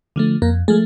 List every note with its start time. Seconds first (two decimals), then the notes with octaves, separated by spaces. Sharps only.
0.16 D3 F3 A3
0.42 F2 A#3 A#4
0.68 F3 G#3 A3 G#4